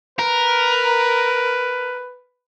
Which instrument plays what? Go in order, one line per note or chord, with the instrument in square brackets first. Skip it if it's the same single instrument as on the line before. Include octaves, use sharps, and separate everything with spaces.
[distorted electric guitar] A#4 [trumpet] B4